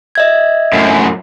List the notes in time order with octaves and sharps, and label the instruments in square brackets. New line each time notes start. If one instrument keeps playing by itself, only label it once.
[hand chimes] D#5 E5 G#6
[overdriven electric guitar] F#2 A2